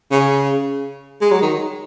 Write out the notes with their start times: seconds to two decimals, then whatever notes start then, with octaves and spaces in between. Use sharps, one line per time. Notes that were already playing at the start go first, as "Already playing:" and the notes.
0.11 C#3
1.21 G#3
1.31 F#3
1.42 D#3